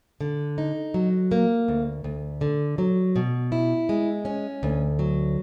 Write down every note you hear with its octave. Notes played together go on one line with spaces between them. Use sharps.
D3
D#4
F#3
A#3
D2
D2
D3
F#3
B2
E4
G#3
C#4
D2
F#3